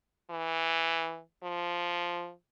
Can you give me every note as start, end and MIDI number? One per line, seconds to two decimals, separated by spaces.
0.30 1.20 52
1.43 2.32 53